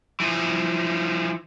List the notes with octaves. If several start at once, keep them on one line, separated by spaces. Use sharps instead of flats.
E3 F3